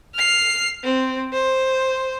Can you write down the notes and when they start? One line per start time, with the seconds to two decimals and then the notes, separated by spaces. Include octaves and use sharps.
0.15 F6 C7
0.83 C4
1.33 C5